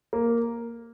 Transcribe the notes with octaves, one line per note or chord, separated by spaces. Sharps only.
A#3